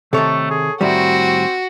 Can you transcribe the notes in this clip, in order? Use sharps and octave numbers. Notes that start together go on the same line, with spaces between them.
C3 D#3 A3 A4 C#5
G#4
A2 D#3 G3 C4 F#4